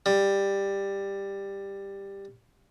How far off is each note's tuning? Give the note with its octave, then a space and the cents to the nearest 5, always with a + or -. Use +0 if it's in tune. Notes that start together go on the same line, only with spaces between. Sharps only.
G3 +10